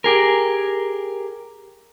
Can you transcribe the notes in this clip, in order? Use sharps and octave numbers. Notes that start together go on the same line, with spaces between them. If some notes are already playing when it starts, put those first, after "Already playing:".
G4 G#4 A#4